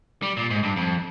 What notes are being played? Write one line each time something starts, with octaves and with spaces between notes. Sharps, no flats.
G3
A#2
G#2
G2
F2